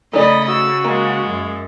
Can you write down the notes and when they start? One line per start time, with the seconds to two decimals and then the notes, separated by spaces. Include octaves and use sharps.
0.13 C#3 A3 D#4 D5 D#5 B5
0.48 F#4 E6
0.84 G#3 A#3
1.25 F#2